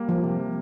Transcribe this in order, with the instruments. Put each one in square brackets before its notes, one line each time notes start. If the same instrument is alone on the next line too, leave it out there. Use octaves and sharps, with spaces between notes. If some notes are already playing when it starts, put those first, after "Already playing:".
Already playing: [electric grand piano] G3 A#3
[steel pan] F3
[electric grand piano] C3